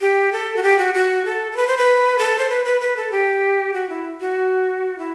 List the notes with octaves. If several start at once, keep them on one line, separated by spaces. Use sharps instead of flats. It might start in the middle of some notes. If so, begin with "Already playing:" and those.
G4
A4
F#4
G4
F#4
F#4
A4
A4
B4
C5
B4
A4
C5
B4
B4
B4
A4
G4
F#4
E4
F#4
E4